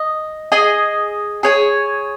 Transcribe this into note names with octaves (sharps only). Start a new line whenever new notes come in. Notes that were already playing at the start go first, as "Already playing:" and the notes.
Already playing: D#5
G#4 D#5 G#5
G#4 C#5 G#5